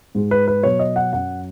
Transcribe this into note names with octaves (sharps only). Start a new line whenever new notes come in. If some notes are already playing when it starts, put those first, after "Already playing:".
G#2 G#3
B4
B4
B2 F#3 C#5
D#5
F#5
F#2 F#3 F#5